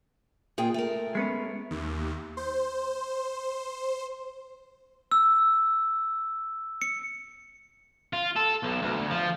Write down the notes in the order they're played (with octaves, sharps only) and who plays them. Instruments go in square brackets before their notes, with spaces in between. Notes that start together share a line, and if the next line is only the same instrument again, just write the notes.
[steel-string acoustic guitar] A#2 G#4 G5
A3 A#4
[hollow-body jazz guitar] G#3 B3 C#4
[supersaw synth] D#2
C5
[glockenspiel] E6
C#7
[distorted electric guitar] F4
A4
B1
D2
F3